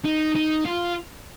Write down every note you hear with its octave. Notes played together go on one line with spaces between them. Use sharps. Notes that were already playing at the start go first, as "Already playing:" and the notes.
D#4
D#4
F4